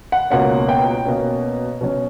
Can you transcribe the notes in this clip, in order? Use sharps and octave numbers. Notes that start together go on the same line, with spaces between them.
F#5
C#2 B2 A#3 C#4 F#5
G5
B2 A#3 C#4
B2 F#3 C#4